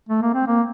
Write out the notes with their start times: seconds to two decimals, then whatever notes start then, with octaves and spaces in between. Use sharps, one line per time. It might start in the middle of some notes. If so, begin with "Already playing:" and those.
0.09 A3
0.22 A#3
0.34 C4
0.47 A#3